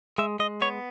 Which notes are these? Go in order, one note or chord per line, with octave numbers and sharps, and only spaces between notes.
G#3 E5
G#3 D#5
B3 C#5